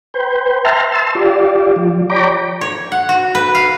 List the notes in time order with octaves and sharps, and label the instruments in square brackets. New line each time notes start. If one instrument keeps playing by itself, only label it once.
[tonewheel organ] B4 C5 G5
E5 G5 A5 A#5 C6 F6
A5 C6 E6
F4 G4 D5
F3
C#5 D5 G5 A#5 B5 D6
[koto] C#5
F#5
F#4
B4
F5